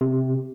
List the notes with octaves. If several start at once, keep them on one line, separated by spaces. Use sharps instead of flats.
C3